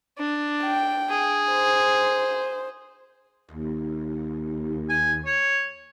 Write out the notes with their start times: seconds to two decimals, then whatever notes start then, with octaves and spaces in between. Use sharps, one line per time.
0.18 D4
0.65 G5
1.09 G#4
1.51 C5
3.52 D#2
4.89 G#5
5.26 C#5